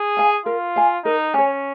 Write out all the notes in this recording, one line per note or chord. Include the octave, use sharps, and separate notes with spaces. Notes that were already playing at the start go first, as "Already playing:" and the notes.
Already playing: G#4
F5 G#5
F4 A#4
F5 G#5
D#4 A#4
C#4 C#5 G#5